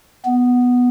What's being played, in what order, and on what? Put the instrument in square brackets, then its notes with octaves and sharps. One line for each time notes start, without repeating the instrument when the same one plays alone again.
[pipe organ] B3